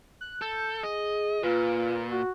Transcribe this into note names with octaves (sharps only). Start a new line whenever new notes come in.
F#6
A4 G6
G#4 D#5
A#2 F4 B4
F#4